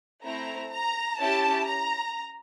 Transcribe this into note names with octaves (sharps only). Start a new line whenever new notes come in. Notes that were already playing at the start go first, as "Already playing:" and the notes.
A3 C4 E4 A#5
A#5
C#4 E4 G4 A5
A#5